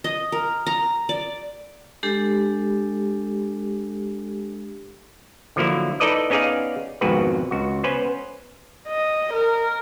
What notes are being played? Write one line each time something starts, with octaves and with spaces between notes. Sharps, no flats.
D#5
A#4
A#5
D5
G#3 D4 G4 A4
D3 F3 F#3 A#3 E4
D#4 E4 A4 B4 D5 D#5
B3 C#4 D#4 G#4 D5 F5
G#1 F2 G#2 B2 F#4 B4
C#2 F#4
B3 C#4 B4 C5
D#5
A#4